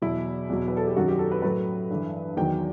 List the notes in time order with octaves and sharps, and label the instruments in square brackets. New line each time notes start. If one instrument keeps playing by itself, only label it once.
[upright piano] E2 B2 F#3 E4
E2 B2 F#3
B4
A4
G4
F#2 D#3 F#3 F#4
G4
A4
B4
A2 F#3 B4
G2 E3
E2 D#3 F#3 G5